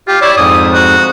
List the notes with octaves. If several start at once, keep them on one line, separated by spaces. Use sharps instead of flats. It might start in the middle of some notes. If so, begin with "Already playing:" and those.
F4 G4
E4 C#5 D5 D6
F2 G#2 D#6
F#4